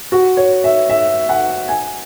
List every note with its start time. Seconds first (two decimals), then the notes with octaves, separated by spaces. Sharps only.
0.12 F#4
0.37 C#5
0.64 E5
0.89 E5
1.29 F#5
1.68 G#5